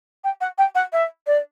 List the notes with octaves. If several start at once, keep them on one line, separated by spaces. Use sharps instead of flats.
G5
F#5
G5
F#5
E5
D5